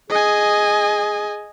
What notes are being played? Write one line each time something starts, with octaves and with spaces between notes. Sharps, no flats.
G#4 D#5 G#5